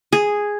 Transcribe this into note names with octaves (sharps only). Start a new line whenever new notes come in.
G#4